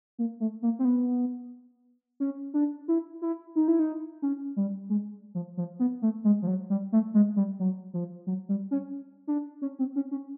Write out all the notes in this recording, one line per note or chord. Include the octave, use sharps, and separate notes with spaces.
A#3
A3
A#3
C4
B3
C#4
D4
E4
E4
D#4
E4
D#4
C#4
G3
G#3
F3
F3
B3
A3
G#3
F3
F#3
G3
A3
G#3
G3
F#3
F3
F#3
G3
C#4
D4
C#4
C4
C#4
C#4